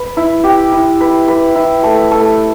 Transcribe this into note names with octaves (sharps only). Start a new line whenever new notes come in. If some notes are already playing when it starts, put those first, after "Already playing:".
Already playing: B4
E4
G4
E4
B4
B4
E4
A3
A3